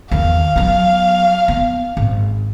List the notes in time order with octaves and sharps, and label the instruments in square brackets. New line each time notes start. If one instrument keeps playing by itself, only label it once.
[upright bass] E2 D#3 [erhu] F5
[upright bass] F#3 B3
B3
G#1